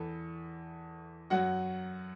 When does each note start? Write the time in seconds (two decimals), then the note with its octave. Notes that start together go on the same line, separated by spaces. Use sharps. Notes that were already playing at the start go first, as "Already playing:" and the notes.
Already playing: E2 E3 A4
1.30 F#2 F#3 F#4 F#5